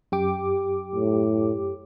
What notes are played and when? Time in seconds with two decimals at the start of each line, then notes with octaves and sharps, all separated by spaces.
0.12 F#2 G4 D6
0.95 A2